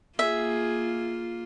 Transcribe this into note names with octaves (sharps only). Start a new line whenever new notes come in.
A#3 F4 G#4 E5